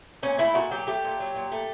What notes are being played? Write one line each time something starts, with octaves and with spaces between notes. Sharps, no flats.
A#2 C#4
A3 E4
A#2 F#4
F#3 G4
A3 G4
A#2
F#3
A#2
A3